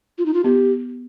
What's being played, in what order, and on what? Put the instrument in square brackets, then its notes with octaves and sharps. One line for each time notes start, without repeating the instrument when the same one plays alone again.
[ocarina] F4
D#4
F4
[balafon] B3 [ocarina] G4